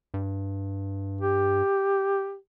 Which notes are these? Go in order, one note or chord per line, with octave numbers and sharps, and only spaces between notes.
G2
G4